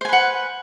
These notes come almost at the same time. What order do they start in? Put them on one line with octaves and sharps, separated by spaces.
C5 G#5 B4 F#5